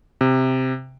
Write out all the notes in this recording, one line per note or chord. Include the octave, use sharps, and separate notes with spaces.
C3